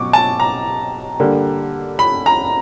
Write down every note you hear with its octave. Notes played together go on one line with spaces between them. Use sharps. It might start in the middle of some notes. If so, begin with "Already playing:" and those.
Already playing: B2 F#3 C#6 D6
A5
A#5
D3 G3 A#3
B5
A#5